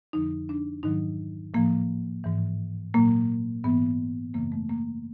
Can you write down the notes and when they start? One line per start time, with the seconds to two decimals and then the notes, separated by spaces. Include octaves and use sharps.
0.13 F2 D3 F3 D#4
0.49 D4
0.83 G#2 D#3 F#3 D#4
1.54 A2 F3 A#3
2.24 G#2 E3
2.94 A#2 F#3 A#3
3.64 G#2 E3 B3
4.34 F#2 C#3 E3 A#3
4.52 A3
4.69 A#3